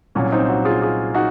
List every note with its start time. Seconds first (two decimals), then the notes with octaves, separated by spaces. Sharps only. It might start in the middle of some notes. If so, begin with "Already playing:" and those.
0.15 C2 A#2 F#3 C#4
0.32 C4 D#4
0.49 D#4 F#4
0.65 F4 G#4
0.81 F4 G#4
1.15 D#4 F#4